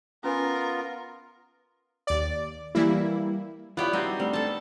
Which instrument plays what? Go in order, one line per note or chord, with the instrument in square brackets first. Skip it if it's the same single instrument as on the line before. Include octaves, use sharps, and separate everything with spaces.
[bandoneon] B3 F4 [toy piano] C#4 B4 G#5 [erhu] A#4
[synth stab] D#2 D5
E3 G3 A#3 E4
[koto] B3 G4 [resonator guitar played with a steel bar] E4 C#5 D5 [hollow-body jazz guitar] F4
[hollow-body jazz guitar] G3 F#4 [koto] C4 D#4 C5
[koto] G3 [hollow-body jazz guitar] A3 C4 D4
[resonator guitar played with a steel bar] B3 [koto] A4 A5